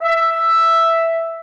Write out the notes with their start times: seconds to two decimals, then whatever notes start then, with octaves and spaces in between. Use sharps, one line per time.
0.02 E5